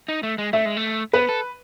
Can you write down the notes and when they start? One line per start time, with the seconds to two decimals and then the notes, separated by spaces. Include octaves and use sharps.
0.08 D#4
0.23 A3
0.38 G#3
0.53 A3 E5
0.65 G#3
0.77 A3
1.13 B3 B4
1.29 A4